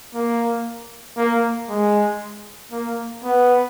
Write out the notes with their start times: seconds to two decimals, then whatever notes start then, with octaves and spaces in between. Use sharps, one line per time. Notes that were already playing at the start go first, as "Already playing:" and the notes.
0.14 A#3
1.17 A#3
1.69 G#3
2.72 A#3
3.24 B3